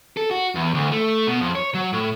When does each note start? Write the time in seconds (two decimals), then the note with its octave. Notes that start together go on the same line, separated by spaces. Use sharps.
0.17 A4
0.31 F#4
0.55 E2
0.74 D2
0.92 A3
1.27 B2
1.41 F2
1.55 C#5
1.74 F#3
1.93 A2